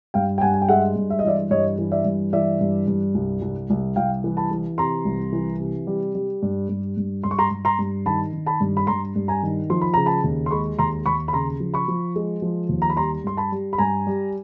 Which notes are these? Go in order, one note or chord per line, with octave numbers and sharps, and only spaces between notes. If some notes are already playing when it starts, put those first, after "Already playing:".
G2 F5 G5
G5
G2 F#5 G#5
G#5
G5
G#3 E5 F#5
G2
E5
D#5
E3 D5 E5
G2 C#5 D#5
E3
D5 E5
G2
E3 D5 E5
G2
G2
C2
C2
C2
C2 F5 G5
E3
A5 B5
E3
C3 A#5 C6
C2
E3
C3
G3
G3
G2
G2
G2
G2 C6
C#6
A#5 C6
G2
A#5 C6
G2
D#3 A5 B5
D#3
A5 B5
G2
B5
G2 A#5 C6
G2
G#5 A#5
D#3
F3 C6
B5
C#3 A#5
A5 B5
D#2
C6
G#3 B5 C#6
D#2 A#5 C6
D#2 B5 C#6
B5
C#3 A#5 C6
F3
B5 C#6
F3
G#3
F3
D#2
A#5
B5
G3 A#5 C6
G2 C6
A5 B5
G3
B5
G2 G#5 A#5
G3